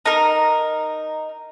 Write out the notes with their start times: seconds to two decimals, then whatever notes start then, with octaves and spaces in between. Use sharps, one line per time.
0.06 D#4 A#4